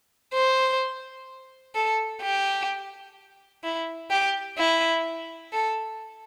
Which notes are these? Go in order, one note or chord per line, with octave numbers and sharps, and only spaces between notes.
C5
A4
G4
E4
G4
E4
A4